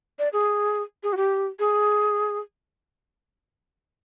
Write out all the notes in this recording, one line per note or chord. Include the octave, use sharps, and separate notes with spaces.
D5
G#4
G#4
F#4
G4
G#4